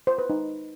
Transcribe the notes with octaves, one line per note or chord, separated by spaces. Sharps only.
C5
B4
D#4